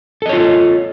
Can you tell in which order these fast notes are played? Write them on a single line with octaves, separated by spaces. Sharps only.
A4 D#5 C#5 F4